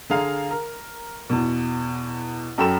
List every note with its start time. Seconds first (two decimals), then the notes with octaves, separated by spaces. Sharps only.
0.10 D3 G#4 F5 A#5
0.51 A#4
1.30 E2 B2
2.58 F#2 F#3 A4 G5 B5 E7